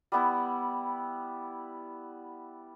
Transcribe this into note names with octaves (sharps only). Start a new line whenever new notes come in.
G3 B3 E4